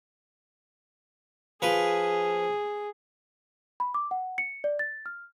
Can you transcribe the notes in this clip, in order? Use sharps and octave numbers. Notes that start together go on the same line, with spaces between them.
F3 G#4 B4
B5
D6
F#5
C#7
D5
A6
F6